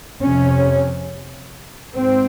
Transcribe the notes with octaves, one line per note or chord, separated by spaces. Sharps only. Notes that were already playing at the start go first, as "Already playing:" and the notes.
F2 C3 C#4
G#2 C4